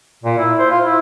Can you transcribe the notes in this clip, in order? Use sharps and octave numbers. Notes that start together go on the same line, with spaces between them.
A#2
E4
C5
F4
E4